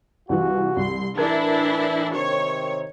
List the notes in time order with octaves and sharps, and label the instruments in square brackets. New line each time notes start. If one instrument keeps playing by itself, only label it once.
[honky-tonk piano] C2 E3 [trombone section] F4 F#4
[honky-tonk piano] C2 [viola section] C6
[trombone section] A2 E3 [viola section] D4 E4 [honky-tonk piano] A#4 G#6
[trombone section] C3 D#3 C4 [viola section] C#5